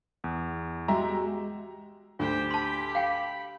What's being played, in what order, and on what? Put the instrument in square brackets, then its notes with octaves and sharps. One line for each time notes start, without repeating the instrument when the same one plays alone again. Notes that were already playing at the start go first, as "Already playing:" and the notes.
[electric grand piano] E2
[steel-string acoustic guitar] G#3 F#4 G4 [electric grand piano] E5 G5 A#5
[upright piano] D2 [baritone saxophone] G4 [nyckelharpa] C5 G5
[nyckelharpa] G5 B5 [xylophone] A5 C6
[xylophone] F5 G5 [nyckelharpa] B5